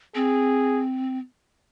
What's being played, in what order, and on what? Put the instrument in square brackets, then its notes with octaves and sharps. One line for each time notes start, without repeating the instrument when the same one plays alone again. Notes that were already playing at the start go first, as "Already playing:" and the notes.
[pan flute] C4 [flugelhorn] G#4